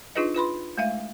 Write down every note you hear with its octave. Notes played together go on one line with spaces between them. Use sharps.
D4 D#4 F4 G#4 B4 D#5
F4 B4 B5 C6
G#3 A3 E5 F5